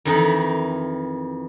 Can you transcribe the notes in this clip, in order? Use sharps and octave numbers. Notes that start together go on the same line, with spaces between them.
F2 D#3 E3 D#4 B5